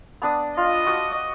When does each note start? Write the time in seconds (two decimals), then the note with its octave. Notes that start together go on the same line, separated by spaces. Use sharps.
0.22 B3 D4 D#6
0.57 F4 D#5
0.87 F#4 D#6